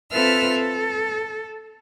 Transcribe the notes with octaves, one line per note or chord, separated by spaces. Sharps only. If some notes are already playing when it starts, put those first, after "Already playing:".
C4 F4 A4 B4 E5 F6
A4